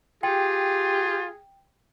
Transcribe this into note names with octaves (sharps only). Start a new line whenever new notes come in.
F4 G4 G#4 G5